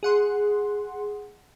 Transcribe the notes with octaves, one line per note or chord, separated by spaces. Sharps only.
G#4 F#5 C6